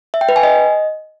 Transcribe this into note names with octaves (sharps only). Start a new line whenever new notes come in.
E5
G5
B4
G#5
D#5